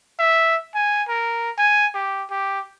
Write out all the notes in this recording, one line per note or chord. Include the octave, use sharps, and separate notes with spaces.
E5
G#5
A#4
G#5
G4
G4